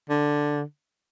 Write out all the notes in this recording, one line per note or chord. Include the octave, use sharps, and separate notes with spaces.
D3